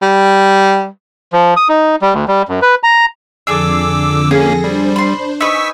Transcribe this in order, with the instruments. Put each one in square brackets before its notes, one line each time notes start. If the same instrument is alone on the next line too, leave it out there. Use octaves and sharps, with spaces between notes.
[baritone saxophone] G3
[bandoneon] F3
D#6
D#4
G3
D2
G3
F#2
B4
A#5
[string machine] F2 D3 [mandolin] D4 G#4 A4 [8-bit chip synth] D6 E6
[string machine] F2 A4 A#6 [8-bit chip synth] A#3 C#4 [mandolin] G#4
[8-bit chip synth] G3 [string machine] D4 C5
[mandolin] B5 C6
[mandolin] D#4 B4 [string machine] G#5 [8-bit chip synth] C#6 E6 B6